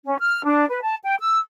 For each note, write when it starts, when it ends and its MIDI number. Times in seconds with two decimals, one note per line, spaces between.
0.05 0.15 61
0.19 0.44 89
0.45 0.66 62
0.69 0.80 71
0.82 0.96 81
1.03 1.15 79
1.19 1.38 88